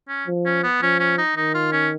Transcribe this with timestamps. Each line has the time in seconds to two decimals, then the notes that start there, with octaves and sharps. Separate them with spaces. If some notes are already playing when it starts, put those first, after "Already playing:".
0.09 C#4
0.27 F3
0.46 C#4
0.64 B3
0.81 F3 C#4
0.99 C#4
1.18 D#4
1.36 D#3 D#4
1.55 F4
1.72 C#4